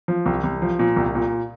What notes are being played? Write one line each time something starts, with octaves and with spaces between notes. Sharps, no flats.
F3
C2
C2
F3
A#2
C2
A#2